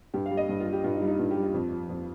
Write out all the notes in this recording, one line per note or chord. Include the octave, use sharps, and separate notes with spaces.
G2 G4
F5
G3
D#5
G2
F4
G3
G4
G2 F4
D#4
G3
D#4
G2 F4
G4
G3
F4
F2
F3
F2